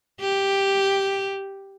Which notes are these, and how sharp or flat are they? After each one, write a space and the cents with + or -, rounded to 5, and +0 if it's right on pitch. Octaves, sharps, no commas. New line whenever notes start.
G4 +0